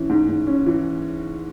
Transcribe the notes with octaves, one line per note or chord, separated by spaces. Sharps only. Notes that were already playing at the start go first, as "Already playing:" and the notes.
Already playing: E3 C#4
G#2
G#2
C#4
E3